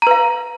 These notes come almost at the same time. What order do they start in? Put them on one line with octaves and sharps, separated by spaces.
A#5 B4 F5